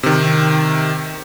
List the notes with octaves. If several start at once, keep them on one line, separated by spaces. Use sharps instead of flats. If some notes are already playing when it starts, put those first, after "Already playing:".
C3 D#3